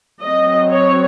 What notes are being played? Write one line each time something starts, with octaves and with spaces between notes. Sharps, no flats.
F#3 C4 D#5
C#5